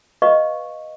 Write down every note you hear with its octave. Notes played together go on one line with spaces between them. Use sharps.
B4 D#5 F5 C#6